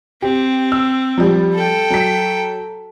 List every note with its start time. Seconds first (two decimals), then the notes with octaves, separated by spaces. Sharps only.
0.22 C4 G4
0.72 E6
1.18 F3 G3
1.54 A4 G5
1.90 F#3 B6